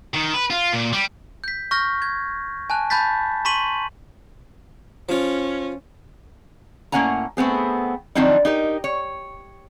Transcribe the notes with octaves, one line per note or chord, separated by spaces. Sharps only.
D#3
B4
F4
A#2
G3
G6 B6
C#6 F6 G6 A#6
G#6
G#5 A5 F#6
A5 B5 G6 A6 B6
A#5 C6 C#6 B6 D#7 F#7
F3 C#4 F4
A2 A#3 C#4 F#5 G#5 A#5
A3 B3 C4 G#4
D#3 F3 F#3 C4 D4 D#4
D#4 G4 A#4
C#5